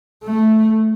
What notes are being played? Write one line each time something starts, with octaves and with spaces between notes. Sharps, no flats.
A3